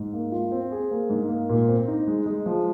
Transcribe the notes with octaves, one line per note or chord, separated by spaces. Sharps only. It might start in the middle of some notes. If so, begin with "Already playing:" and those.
Already playing: G#2
A#3
F4
C4
G#4
A#3
G#2
A#3
A#2
C4
D#4
G#3
G#3
F3